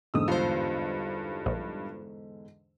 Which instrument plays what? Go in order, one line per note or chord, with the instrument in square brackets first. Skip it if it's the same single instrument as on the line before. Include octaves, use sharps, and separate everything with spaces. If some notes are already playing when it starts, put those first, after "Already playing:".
[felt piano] E2 G#2 D3 [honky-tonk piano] D#6 E6
[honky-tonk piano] G2 [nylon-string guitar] F4 C5
[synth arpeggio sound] A#1